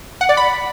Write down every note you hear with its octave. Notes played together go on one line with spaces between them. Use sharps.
F#5
D5
B5